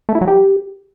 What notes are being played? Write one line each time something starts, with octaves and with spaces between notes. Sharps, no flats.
A3
E4
F#3
G4